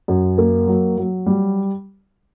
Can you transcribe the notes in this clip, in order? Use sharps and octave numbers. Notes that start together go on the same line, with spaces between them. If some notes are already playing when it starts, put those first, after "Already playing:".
F#2
A#3
F#3
F#3
G3